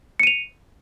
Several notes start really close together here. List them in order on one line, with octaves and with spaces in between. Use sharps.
C#7 D#7 F7